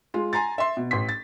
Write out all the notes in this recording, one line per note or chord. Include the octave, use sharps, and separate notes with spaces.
G#3 F4
G#5 A#5 C6 A6
E5 C6
B2
A1 C6 B6
A6